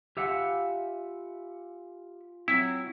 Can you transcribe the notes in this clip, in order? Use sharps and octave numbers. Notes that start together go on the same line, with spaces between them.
F4 G4 E5 F#5 G#5 B5
F#3 C4 E4